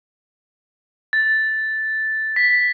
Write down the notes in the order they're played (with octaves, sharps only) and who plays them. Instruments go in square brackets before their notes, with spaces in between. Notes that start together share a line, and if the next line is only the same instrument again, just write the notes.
[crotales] A6
B6